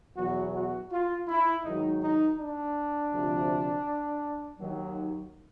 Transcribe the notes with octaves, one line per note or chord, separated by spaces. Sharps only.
E2 B2 F#3 F#4
F#4
F4
E4
G#2 D#3 F#3 D#4
D#4
D4
D2 C3 F3
D#2 D#3 F#3